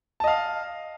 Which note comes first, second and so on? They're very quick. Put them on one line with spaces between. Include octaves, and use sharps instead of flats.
A5 D#5 F5